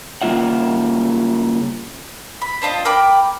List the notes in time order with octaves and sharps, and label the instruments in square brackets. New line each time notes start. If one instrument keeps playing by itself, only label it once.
[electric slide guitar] C#3 G3 A#3 F4 E5 F#5
[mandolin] B5
C4 D4 F4 D#5
A#4 G5 B5 D6